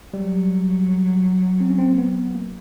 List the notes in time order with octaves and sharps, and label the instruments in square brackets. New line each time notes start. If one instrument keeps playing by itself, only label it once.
[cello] F#3 [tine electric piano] G3
[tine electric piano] C4
C#4
C4
A#3
B3
A#3